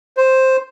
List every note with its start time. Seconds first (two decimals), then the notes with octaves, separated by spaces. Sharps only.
0.17 C5